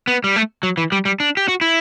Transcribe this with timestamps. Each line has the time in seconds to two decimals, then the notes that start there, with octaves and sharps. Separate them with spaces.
0.07 B3
0.24 G3
0.36 A3
0.63 F#3
0.77 E3
0.92 G3
1.05 G3
1.20 D4
1.37 G4
1.48 F#4
1.61 E4